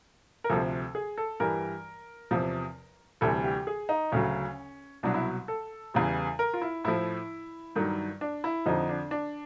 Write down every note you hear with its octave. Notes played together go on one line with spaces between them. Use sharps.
A#4
D2 C3 F3 A4
G#4
A4
G2 E3 G3 A#4
E2 C3 F3
D2 C3 E3 G3 A4
G4
G#4
D#4
D2 C#3 F#3 C#4
C2 B2 F#3 D4
E4
A4
E2 C#3 E3 G3
A#4
F4
E4
A2 F3 E4
G2 D#3 F#3
D4
E4
F2 D3 F3 D#4
D4
D4